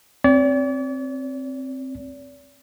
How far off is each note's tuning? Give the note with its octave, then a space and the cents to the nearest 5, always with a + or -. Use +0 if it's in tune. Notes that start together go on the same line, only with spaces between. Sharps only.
C4 +10 D5 -45